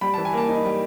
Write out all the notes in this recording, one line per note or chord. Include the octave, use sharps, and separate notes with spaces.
G3 B5
E3 A5
G#5
A#3 A5
D#4
G3